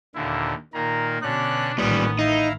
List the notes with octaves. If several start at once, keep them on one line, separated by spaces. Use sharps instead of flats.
D#2 A#2 D3 E4
A#2 D#3 A#3 A#5
B2 D3 C#4 D4 F#6
A1 A#2 D#3 G3 B3 C#4 B4
D#4 E4 F5 A#5